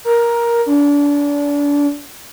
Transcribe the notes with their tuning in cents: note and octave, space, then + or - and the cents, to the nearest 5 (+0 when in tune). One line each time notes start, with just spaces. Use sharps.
A#4 +10
D4 -30